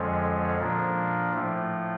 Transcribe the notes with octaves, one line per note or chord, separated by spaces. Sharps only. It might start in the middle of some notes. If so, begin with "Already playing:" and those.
Already playing: F2 D3 F3 G#3 C#4
A#2 F3 A#3 D4
A2 F3 A3